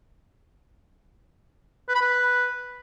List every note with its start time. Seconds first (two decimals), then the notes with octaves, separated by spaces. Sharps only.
1.89 B4
1.95 B5
2.01 B4